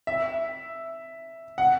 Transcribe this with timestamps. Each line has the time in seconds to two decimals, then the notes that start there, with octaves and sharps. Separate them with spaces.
0.07 E5
1.58 F#5